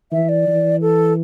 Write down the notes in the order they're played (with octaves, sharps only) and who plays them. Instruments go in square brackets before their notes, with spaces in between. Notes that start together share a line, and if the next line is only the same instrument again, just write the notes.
[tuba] E3 [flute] E5
[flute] D5
[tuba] E3
[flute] A4